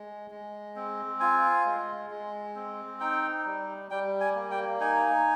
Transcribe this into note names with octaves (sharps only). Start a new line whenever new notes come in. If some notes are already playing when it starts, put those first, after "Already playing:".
Already playing: G#3
G#3
C4
F4 G#5
G#3
G#3
C4
D#4 G5
G3
G3 G5
G#5
A#3
G5
D#4 G#5